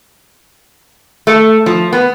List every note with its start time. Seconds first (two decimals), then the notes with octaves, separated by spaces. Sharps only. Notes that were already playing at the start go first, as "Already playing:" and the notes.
1.27 A3
1.66 F3
1.93 B3